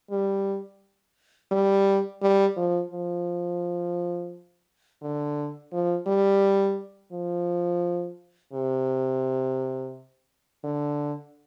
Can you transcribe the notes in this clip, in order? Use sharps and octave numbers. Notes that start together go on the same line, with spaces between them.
G3
G3
G3
F3
F3
D3
F3
G3
F3
C3
D3